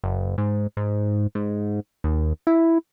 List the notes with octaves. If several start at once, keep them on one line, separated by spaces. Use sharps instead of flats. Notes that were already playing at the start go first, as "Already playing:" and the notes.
F#1
G#2
G#2
G#2
D#2
E4